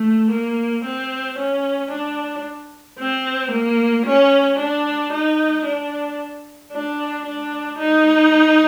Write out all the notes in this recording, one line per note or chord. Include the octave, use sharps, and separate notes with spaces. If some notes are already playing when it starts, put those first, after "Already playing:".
Already playing: A3
A#3
C4
C#4
D4
C4
A#3
C#4
D4
D#4
D4
D4
D4
D#4